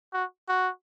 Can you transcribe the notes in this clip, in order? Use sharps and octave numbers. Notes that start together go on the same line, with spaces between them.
F#4
F#4